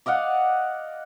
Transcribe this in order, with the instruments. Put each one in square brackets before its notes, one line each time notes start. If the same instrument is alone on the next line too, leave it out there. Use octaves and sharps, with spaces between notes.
[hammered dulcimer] D5 D#5 F5 F#5